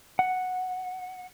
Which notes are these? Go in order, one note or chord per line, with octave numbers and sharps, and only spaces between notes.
F#5